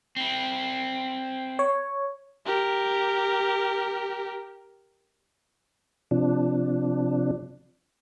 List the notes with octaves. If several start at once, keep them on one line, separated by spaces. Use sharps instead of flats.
C4 E4
C#5
G4 A#4
C3 F3 D4